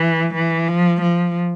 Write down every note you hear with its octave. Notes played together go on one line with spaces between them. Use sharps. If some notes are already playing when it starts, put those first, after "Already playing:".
Already playing: E3
E3
F3
F3